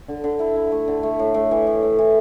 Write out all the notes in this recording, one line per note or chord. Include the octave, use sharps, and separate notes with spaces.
D3
D3
E4
E4
A3
D3
A3
A2
A2
E3
A2
A2
E3